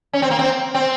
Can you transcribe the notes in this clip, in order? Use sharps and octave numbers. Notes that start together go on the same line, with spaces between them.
C#4
C4
A#3
C4
C4